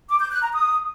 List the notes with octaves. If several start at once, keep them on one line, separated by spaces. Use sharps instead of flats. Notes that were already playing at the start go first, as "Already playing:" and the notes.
D6
G6
F#6
A#5
D#6